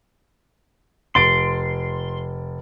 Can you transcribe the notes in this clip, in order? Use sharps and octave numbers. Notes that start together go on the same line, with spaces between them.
F1 C6 A6 D7